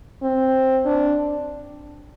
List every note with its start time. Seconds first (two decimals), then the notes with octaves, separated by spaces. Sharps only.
0.22 C4
0.86 D4